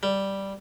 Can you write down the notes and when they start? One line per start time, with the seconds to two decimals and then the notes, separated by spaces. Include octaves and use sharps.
0.03 G3